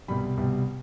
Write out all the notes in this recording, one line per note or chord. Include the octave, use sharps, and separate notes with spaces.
C2 B2 G3 B5
C2 B2 G3